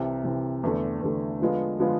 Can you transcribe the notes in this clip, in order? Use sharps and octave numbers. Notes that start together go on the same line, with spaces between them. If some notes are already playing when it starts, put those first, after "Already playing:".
Already playing: C2 C3 E3
C2 C3 E3
E2 D3 A3
E2 D3 A3
D3 F3 G#3 B3 F4
D3 F3 G#3 B3 F4